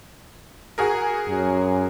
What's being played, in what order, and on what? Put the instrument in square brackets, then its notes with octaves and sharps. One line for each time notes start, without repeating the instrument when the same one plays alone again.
[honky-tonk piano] F#4 G#4 A#4
[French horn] F#2